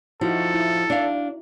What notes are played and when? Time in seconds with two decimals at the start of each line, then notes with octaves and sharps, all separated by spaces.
0.21 F3 D#4 E4 F#4 A4
0.54 E4
0.90 D4 F5